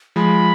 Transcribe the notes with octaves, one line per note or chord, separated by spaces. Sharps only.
F3 G#3 B5